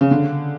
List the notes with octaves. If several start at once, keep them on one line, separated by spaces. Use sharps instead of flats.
C#3
D3